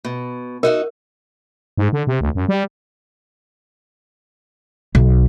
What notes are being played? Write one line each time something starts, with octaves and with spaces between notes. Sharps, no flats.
B2
D#4 F#4 A#4 E5
G#2
D3
C3
D2
F#2
G3
B1